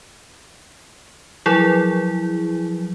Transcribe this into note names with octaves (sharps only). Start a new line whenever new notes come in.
F3 F#3 E4 G#4